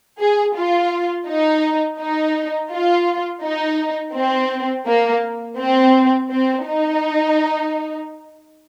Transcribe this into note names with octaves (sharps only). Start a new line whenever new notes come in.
G#4
F4
D#4
D#4
F4
D#4
C4
A#3
C4
C4
D#4